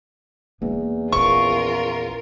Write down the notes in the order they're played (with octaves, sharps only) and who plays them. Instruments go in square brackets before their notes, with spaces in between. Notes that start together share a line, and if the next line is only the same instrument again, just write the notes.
[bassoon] E2 [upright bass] A#3 D4
[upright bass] A#1 C#4 [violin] F4 A#4 [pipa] C#6